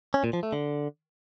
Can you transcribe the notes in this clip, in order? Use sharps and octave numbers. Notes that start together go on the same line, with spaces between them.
C#4
A#2
F3
A3
D3